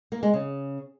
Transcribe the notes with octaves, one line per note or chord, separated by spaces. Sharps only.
A#3
G#3
C#3